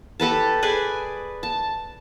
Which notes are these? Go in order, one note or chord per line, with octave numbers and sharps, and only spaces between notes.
G4 A4 B4 A5
G#4 B4 D5 G#5
A5